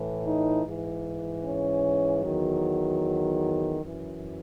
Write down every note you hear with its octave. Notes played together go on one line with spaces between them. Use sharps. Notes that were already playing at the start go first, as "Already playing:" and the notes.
Already playing: A2 E3
D#4
G#2 E3
C#4
E2 D#3 F#3
F#2 E3